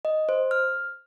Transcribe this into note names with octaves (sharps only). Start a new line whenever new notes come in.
D#5
C5
F6